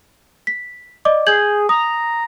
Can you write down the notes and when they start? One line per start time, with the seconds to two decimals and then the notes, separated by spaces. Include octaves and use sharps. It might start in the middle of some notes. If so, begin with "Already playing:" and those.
0.47 B6
1.05 D5 D#5 D6
1.27 G#4 G6 G#6 F#7
1.69 A#5 D#6